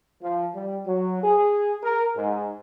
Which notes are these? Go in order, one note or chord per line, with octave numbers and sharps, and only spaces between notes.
F3
G3
F#3
G#4
A#4
G#2